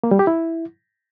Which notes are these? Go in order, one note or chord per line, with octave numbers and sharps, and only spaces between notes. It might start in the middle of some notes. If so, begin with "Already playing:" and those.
A#3
G3
G4
E4